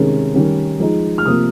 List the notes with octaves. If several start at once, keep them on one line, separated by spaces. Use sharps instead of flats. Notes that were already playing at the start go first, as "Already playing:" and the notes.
Already playing: C3 D#3 G#3 C#4
D#3 G3 C#4
F3 G#3 D#4
F6
C3 F3 A#3 D#6